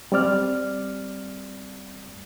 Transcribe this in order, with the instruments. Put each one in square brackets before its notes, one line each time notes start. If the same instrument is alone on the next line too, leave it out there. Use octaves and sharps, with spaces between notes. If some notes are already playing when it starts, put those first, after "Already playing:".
[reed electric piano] G3 C4 D5 F6